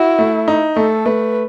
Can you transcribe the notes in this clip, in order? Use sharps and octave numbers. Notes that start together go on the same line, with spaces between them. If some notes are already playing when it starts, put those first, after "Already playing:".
Already playing: E4 F#4
A3
D#4
A3 A4
A3 B4